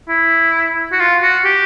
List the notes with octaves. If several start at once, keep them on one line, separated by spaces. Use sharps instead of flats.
E4
F#4
F4
F#4
G4